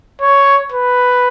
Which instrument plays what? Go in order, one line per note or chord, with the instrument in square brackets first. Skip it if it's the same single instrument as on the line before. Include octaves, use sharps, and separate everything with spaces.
[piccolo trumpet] C#5
B4